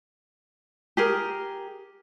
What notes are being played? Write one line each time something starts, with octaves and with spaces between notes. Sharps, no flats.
G4 G#4 A#4